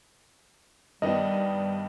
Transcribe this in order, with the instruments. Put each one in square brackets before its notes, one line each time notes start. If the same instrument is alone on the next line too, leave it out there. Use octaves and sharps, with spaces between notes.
[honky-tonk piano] G2 D#3 B3 [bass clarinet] G3 [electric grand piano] D#5